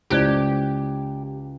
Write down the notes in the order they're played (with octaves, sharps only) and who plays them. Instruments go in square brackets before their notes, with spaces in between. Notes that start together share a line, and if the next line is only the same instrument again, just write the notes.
[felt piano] C#2 D7 [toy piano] E4 C5 D5 [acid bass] G4